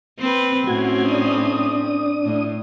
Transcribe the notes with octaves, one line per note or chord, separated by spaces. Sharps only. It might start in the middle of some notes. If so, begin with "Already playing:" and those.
C4 B4
A2 C4 C#4 F#4 G#6
D4 D#6
A2